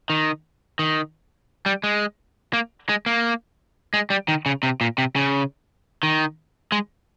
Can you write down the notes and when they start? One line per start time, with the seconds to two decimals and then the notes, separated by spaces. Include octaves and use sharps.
0.10 D#3
0.79 D#3
1.66 G3
1.84 G#3
2.53 A#3
2.89 G#3
3.06 A#3
3.94 G#3
4.10 G3
4.28 D#3
4.46 C#3
4.63 C3
4.81 A#2
4.98 C3
5.16 C#3
6.03 D#3
6.72 G#3